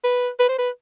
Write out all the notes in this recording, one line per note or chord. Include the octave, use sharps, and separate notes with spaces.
B4
B4
C5
B4